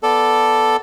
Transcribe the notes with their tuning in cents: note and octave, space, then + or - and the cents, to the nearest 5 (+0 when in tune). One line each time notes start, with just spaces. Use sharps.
B3 +0 A4 +0 D5 +0